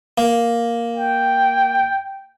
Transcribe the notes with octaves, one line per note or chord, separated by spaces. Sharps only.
A#3
G5